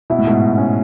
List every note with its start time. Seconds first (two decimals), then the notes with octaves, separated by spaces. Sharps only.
0.10 B2 E4
0.18 A2
0.27 G#2 B2
0.58 C#4